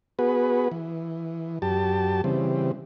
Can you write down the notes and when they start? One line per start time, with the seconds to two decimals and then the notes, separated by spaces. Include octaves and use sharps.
0.19 B3 F#4 G#4 B4
0.71 E3
1.62 F#2 G4 A5
2.24 C#3 E3 G3 C4